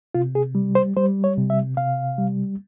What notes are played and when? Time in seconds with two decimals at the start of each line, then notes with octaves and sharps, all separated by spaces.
0.15 C3 F4
0.35 G#4
0.55 G3
0.75 C5
0.96 G3 C5
1.24 C#5
1.37 C3
1.50 E5
1.77 C3 F5
2.18 G3